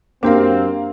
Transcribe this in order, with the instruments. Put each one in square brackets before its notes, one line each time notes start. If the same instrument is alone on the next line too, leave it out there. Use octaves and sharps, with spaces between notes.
[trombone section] F#2 C4 [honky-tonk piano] A#3 F5 [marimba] D4 G4 A#4